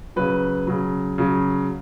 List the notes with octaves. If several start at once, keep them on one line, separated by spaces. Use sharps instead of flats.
C#3 F#3 B4
C#3 F#3
C#3 F#3